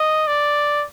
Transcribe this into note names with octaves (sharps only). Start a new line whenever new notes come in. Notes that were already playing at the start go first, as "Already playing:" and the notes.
Already playing: D#5
D5